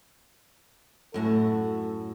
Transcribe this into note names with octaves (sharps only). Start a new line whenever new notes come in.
F#2 A2 F#4 A4